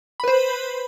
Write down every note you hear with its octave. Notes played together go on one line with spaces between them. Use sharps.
B4 C5 B5